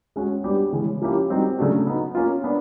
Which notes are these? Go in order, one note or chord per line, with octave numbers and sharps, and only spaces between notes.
G#3 C#4 F#4
G3 B3 D4 G4
C#3 E3 G#3 C#4
F3 A#3 C#4 E4 G4
G3 C4 D#4 F#4
C#3 F#3 A3 D4 F#4
B3 D#4 F#4
A#3 C#4 F4
B3 D4